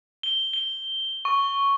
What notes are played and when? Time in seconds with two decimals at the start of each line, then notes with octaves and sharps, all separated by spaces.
0.23 G7
0.53 G7
1.25 C#6